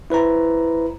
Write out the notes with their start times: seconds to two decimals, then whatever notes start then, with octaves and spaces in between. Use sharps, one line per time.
0.10 E4 B4 C5 A#5